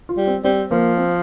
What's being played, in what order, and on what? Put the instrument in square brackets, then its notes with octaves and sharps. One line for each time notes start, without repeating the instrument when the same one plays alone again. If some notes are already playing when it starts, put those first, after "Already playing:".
[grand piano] F4
[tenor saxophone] G3
[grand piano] C4
[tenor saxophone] G3 [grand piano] C4
[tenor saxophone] F3 [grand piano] A#3
[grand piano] C4